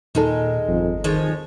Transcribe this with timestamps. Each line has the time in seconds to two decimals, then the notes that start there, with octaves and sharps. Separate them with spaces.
0.15 D#2 A#2 D#3 G#3 D#4 A4
0.68 G1 F2
1.04 D#3 F3 G#3 C#5